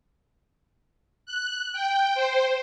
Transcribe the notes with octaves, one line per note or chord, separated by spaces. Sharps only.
F#6
G5
C5